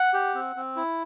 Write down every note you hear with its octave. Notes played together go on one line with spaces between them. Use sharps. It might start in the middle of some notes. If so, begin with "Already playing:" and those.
Already playing: F#5
G4
C4
C4
E4